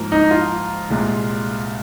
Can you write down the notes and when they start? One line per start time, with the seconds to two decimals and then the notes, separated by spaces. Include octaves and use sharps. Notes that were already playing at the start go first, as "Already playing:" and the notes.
Already playing: G#2 F3 A#3
0.12 D#4
0.31 F4
0.90 C2 A#2 G#3